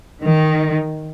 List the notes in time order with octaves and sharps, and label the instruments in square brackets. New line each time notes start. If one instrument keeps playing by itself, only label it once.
[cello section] D#3